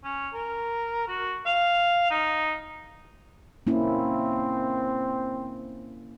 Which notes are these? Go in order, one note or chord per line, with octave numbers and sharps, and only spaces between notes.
C#4
A#4
F#4
F5
D#4
A#3 C4 C#4 E4